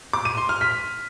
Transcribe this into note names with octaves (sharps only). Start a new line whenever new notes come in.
D6
D#7
C6
F6
B6